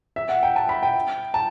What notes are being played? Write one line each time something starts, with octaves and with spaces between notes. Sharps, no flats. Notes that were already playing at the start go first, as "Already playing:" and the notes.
E5
F#5
G5
A5
B5
G5
A5